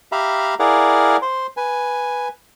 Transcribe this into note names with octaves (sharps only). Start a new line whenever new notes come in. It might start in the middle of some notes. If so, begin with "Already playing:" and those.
G4 E5 F5 A#5 B5
E4 G#4 A#4 D5 F5 F#5
C5 C6
B4 G#5